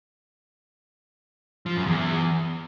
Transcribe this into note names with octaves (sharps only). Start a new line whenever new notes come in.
F3
F#2
E2